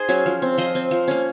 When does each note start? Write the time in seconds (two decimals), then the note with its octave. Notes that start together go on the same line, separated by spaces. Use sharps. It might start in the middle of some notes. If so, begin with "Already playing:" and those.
Already playing: D#4 G#4 C5
0.09 F#3 C#4
0.26 F3
0.42 C4
0.58 F3 C5 D#5
0.75 C4
0.91 F3
1.08 A#3 C#4